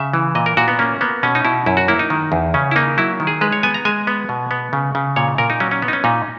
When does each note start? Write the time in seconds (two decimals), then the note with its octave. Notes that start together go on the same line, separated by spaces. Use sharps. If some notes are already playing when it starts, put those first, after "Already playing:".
Already playing: C#3 E5
0.13 E3
0.35 A#2 D#5
0.46 A#4
0.57 A#2 F#4
0.68 B3
0.79 A#3 C#4
1.01 A#3 B3
1.23 B2 C#4
1.35 D#4
1.45 B2 E4
1.66 F#2 E4
1.77 F#4
1.88 A#3 E4
1.99 D#4
2.10 D#3
2.32 E2
2.54 C#3 C#4
2.71 E4
2.76 A#3 D#4
2.98 F#3 E4
3.20 D#3
3.27 G#4
3.41 G#3 B4
3.52 C#5
3.63 B3 G#5
3.74 A#5
3.85 G#3 G#5
4.07 B3
4.29 B2
4.51 B3
4.73 C#3
4.95 C#3
5.16 A#2 C#5
5.38 A#2 A#4
5.50 D#4
5.60 F#3 C#4
5.71 C#4
5.82 B3
5.88 D#4
5.93 C#4
6.04 A#2 D#4